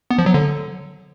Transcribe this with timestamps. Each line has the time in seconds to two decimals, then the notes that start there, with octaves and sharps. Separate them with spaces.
0.11 B3
0.18 F3
0.26 F#3
0.34 D3